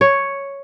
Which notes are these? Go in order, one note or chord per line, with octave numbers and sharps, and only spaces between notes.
C#5